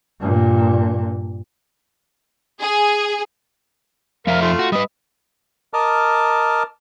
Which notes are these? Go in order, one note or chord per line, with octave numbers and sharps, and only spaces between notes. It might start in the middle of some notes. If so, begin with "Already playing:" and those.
G2 A#2
G#4
F2 F3 A#4 E5 F5
A3 F4
F#4
G3 B4 D#5
A#4 D#5 A5 D6 F6